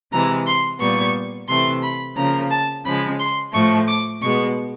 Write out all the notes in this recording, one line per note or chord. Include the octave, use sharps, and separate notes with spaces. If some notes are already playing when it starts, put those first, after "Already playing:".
C3 E3 G#3 A#5
C6
A#2 G3 B3 C#6
C3 E3 A3 C6
B5
C#3 F3 A#3 A#5
A5
C#3 F3 G#3 B5
C6
A2 F3 A3 C#6
D6
B2 G#3 B3 C#6